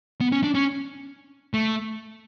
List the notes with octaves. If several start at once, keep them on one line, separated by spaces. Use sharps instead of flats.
B3
C#4
D4
C#4
A3